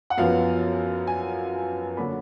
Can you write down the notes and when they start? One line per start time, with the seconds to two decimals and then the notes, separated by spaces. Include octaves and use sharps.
0.10 F#5
0.18 F#2 F3 B3 F5
1.07 G#5
1.97 D3 F#3 A#3 D4 B5